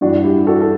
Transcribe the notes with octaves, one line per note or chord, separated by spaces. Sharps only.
G2 E3 D4 F#4
E4 G4
F#4 A4
A4